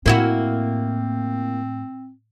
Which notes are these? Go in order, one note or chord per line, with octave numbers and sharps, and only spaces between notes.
A2 A#3 C4 E4 F#4